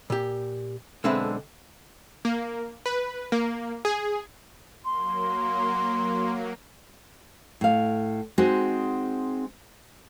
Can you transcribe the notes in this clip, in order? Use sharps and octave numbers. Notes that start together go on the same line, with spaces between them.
A#2 G4
B1 D3 G#3 C4 B4 E5
A#3
B4
A#3
G#4
F#3 A#3 C6
A2 F5
G#3 C4 D#4 F#4